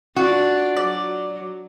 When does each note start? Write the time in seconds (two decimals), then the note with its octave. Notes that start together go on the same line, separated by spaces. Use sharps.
0.16 D4 F4 F#4 D5
0.76 F#3 D5